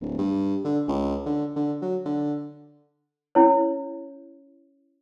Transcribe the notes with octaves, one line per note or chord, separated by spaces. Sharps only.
D1
G2
D3
C#2
D3
D3
F#3
D3
C#4 E4 C#5